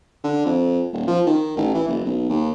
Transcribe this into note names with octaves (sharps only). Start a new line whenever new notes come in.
D3
F2
D#1
F3
D#3
A1
E3
F#1
B1
D#2